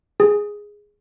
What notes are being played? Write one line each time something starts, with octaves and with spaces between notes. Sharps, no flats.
G#4